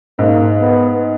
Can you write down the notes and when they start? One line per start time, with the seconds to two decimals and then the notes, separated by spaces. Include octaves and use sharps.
0.19 G#2 A#3
0.60 B3